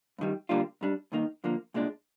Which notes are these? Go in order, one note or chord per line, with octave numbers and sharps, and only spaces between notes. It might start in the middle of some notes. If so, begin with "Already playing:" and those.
G2 D#3 G3
D3 G3 A#3 D4 F4
G#2 G3 D4
G2 D#3 A#3 D#4
F2 D3 F3 A#3
C2 A#2 G#3 D4